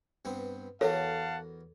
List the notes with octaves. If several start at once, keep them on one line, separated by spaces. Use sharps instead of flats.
G2 B3 C4
E2 F#4 A4 A#4 C#5 F5 F#5 A5